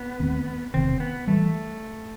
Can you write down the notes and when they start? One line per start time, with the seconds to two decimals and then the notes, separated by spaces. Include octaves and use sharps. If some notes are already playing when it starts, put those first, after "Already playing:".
Already playing: B3
0.20 D#2 D#3 A3 C4
0.74 E1 E2 C3 D#3 C4
1.00 B3
1.27 E3 G3 A3